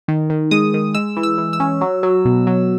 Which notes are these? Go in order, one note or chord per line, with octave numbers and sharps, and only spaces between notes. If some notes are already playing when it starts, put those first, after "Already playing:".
D#3
D#3
G#3 D#6
D#3
G#3 E6
E3
E6
E3
E6
C#4
F#3
F#3
B2
F#3